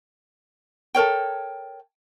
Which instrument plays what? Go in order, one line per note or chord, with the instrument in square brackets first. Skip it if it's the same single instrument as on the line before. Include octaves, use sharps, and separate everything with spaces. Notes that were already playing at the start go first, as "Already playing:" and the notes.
[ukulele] A4 A#4 C#5 G5